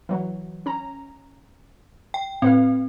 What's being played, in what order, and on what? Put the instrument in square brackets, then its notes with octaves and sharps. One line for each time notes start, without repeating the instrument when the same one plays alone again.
[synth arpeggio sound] E3 F#3
C#4 A#5
[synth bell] G5
[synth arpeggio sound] A2 B4 F5 [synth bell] C4